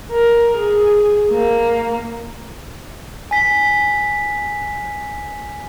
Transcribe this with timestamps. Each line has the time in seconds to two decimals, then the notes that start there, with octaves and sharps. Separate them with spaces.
0.12 A#4
0.57 G#4
1.30 A#3
3.31 G#5 B6